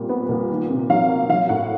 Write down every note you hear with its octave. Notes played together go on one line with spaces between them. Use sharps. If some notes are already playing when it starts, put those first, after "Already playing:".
Already playing: A#2 G3 C4
B3
A#2
D#3
C3
F#3 F5
A#3
F#3 F5
A2 F#5